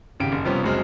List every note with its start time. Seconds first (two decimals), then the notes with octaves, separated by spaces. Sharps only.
0.20 G#1 C#3 G4 D7
0.32 F#1
0.45 C3 F3 G3 B3 C#4
0.63 F#1 F#3 G#3 C4 F6